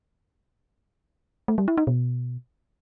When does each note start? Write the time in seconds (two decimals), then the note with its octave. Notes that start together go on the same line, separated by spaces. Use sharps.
1.48 A3
1.58 G3
1.68 E4
1.77 D#4
1.87 B2